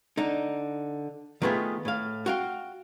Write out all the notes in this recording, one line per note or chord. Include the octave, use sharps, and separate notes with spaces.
D3 D#4
D#3 A3 B3 F4 G#4
A2 F5
F#4 F5 G5